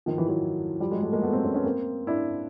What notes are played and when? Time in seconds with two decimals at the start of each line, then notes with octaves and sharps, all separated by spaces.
0.06 D#3 F3
0.17 E3 F#3
0.28 E3 F#3
0.80 F3 G3
0.91 F#3 G#3
1.02 G3 A3
1.12 G#3 A#3
1.22 A3 B3
1.33 A#3 C4
1.44 B3 C#4
1.54 B3 C#4
1.65 A#3 C4
2.07 D4 E4